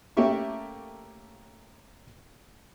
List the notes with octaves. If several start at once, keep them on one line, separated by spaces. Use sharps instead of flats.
A3 A#3 C#4 G4 E5 C#6